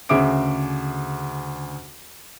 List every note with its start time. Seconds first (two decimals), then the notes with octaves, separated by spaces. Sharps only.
0.09 D2 C#3 G#4 E5 D6 D7